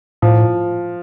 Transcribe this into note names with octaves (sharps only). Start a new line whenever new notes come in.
A2 F3